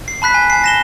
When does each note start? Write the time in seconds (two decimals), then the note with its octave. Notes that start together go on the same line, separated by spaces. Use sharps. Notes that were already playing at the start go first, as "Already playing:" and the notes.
0.08 C7
0.22 A5 B5 F#6 B6
0.34 G#5
0.50 G#5 A5 C7
0.64 A#6 E7 G7